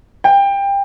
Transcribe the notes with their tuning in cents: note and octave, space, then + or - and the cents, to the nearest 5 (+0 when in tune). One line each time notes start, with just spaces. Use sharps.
G5 +25